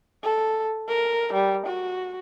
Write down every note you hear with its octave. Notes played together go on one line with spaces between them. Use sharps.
A4
A#4
G3
F#4